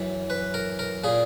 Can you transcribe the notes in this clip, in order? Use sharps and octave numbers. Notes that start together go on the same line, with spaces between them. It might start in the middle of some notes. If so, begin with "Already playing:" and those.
Already playing: F#2 E3
B4
A#4
A#4
A#2 G#4